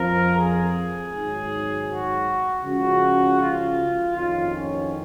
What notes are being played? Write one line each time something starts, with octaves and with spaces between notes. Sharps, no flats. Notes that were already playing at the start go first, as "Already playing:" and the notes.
Already playing: F2 F3 A#4
G#4
G#1 G#2 F#3
F#4
C#2 C#3 F3 F#4
F4
F#1 F2 D#3 F#3 F4
C#4